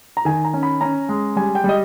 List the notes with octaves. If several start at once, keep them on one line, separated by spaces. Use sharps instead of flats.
A#5
D#3 G#5
A#5
C#4
B5
C#4 A#5
G#3
G3 G#5
G5
G3 D#5